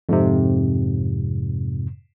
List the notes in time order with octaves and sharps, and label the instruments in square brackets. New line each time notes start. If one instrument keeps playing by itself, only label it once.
[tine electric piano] F2 G#2 C3